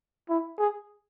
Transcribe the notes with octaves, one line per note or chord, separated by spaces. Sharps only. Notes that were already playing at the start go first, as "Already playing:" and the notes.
E4
G#4